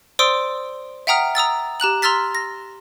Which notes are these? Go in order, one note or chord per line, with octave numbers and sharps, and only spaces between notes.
C5 D5 C6 D#6 E6 D7
E5 F#5 G5 A#5 D#6 F6
A#5 D#6 E6 A6
G4 A#5 F#6 F#7
A#5 C6 E6 F6 A6 B6
A#6